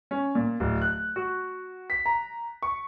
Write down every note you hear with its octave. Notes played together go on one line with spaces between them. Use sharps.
C#4
A#2
D1
F#6
F#4
B6
A#5
C#6